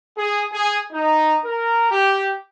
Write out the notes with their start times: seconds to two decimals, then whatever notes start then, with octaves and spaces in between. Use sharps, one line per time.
0.17 G#4
0.52 G#4
0.92 D#4
1.45 A#4
1.91 G4